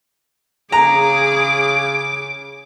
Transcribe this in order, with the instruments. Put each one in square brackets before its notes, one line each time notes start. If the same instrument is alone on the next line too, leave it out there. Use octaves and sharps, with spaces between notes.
[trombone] C#3 [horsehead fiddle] G#4 [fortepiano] A#5 [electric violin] D6